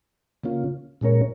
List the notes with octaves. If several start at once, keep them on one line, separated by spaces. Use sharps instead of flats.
C#3 A#3 C#4 F4
A#2 G#3 C#4 A#4 C#5